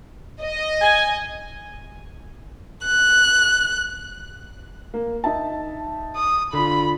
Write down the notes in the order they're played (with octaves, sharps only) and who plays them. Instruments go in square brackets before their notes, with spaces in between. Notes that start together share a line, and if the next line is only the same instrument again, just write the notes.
[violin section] D#5
[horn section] G#5
[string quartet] F#6
[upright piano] A#3
D#4 E5 A5
[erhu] D#6
[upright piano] D3 F4 [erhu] B5